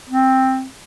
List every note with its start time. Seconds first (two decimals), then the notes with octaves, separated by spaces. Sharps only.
0.10 C4